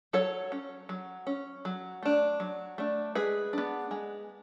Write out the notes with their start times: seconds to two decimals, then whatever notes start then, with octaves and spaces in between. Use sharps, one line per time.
0.13 F#3 A4 C#5
0.52 C#4
0.89 F#3
1.27 C#4
1.65 F#3
2.03 A3 D4
2.40 F#3
2.78 A3 D4
3.15 G#3 G#4 B4
3.53 B3 D4
3.91 G#3